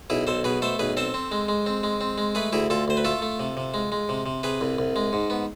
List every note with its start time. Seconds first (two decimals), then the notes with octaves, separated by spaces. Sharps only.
0.10 B1 E4 G#4
0.27 B1 A4 C5
0.44 B2 G#4 B4
0.62 A3 A4 C5
0.79 B1 G#4 B4
0.97 C4 A4 C5
1.14 C4
1.32 G#3
1.48 G#3
1.66 C4
1.83 G#3
2.01 C4
2.18 G#3
2.35 A3 G#4 B4
2.53 D2 E4 G#4
2.70 D2 F4 A4
2.88 D2 C5
2.97 B4
3.05 A3 F4 A4
3.22 A3
3.40 C3
3.57 C3
3.74 G#3
3.92 G#3
4.09 C3
4.26 C3
4.43 C3 G#4 B4
4.61 C2
4.78 C2
4.96 G#3
5.13 G#2
5.30 B3